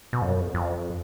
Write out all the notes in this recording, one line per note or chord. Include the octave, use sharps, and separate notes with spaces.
B2
F2
F#2
F2
F2